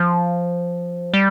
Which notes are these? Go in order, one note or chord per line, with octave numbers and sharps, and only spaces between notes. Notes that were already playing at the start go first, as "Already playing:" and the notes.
Already playing: F3
G3